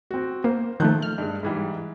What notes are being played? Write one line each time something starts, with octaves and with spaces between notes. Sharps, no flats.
C4 F#4
A#3 C5
D#3 F3 A3 A5 F#6 G6
F6
G2 G#3
G#2 E3 G3